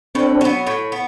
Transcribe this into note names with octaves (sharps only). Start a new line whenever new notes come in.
A2 C4 D4
F#3 B3
A2
B3